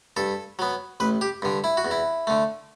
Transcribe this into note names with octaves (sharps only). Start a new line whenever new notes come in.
G2 A4
F#3 B3
A1 B4
G4
G2 D3
E4
F#4
E2
E4
D3 A3